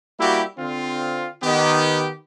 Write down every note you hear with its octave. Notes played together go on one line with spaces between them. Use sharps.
G3 A#3 E4 F#4 G4
D3 C4 F4
D#3 B3 G4